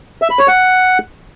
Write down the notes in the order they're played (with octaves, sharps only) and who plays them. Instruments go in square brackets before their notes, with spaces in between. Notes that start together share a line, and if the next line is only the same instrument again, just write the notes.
[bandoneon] E5
B5
C#5
F#5